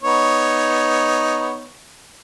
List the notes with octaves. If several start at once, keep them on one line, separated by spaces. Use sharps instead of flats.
B3 D#4 C#5